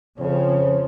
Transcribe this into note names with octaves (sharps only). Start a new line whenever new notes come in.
F2 C#3 F3 C5 C#5